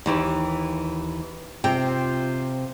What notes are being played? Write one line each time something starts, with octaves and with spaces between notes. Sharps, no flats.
D#2 E3 G4
C3 F4 C5 G5